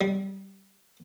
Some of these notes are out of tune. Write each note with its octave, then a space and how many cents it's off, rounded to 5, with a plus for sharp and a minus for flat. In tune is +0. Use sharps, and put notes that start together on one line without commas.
G3 -15